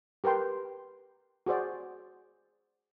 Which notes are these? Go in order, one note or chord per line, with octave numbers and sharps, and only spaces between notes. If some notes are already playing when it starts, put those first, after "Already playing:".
G4 A#4 B4 G5 C6
F#4 G#4 C5 D5